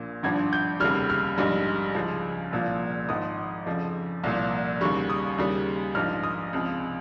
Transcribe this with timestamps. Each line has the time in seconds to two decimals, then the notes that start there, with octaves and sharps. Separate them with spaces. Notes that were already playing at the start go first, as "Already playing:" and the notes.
Already playing: A#1 A#2
0.23 G#1 G2 F3 G#6
0.53 G6
0.80 F1 D#2 C#3 G3 F6
1.10 F6
1.38 A#1 G#2 G3
1.95 C#2 C#3 F3
2.52 C2 A#2 F3
3.09 G#1 G#2 F3 D#6
3.66 F2 C#3 F3
4.24 C2 A#2 F3
4.81 D#2 C#3 G3 C#6
5.10 D#6
5.38 D#2 C#3 G3
5.95 A#1 G#2 F3 F6
6.23 D#6
6.53 C#2 C3 F3